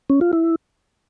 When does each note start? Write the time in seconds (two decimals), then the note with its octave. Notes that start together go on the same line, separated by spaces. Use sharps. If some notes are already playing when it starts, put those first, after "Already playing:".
0.10 C#4
0.21 F4
0.33 E4